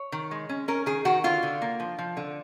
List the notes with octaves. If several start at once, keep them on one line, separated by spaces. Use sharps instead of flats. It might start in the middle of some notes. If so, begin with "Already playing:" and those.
Already playing: C#5
D#3
G#3
C#4
C#4 A#4
D#3 G#4
D#3 F#4
D3 F4
D3
A#3
F3
F3
D3